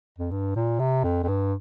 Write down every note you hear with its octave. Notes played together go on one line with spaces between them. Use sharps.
F2
G2
A#2
C3
F2
F2
G2